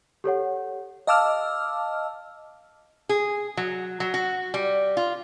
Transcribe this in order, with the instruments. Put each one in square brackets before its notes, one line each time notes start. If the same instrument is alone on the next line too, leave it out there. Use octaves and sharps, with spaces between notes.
[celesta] G4 A4 C#5 F#5
[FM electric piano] D#5 F5 A5 D6 E6 F6
[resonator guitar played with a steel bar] G#4
F#3
F#3
F#4
G3
F4